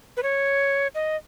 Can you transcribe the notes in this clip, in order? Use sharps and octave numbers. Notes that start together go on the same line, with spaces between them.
B4
C#5
D#5